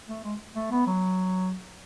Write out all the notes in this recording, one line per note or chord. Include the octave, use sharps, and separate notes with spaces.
A3
G#3
A3
B3
F#3